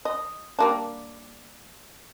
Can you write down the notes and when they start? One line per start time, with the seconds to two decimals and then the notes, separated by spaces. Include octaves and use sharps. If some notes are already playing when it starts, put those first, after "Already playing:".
0.05 D#5
0.59 G3 A#3 D4